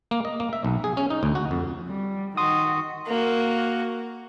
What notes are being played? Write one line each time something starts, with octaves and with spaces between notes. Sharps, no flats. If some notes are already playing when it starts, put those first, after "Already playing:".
A#3
D#5
A#3
E5
B1
G#4
C#4
D#4
D2
F#4
F2
G3
D#3 F#4 C6 D#6
A#3 F#4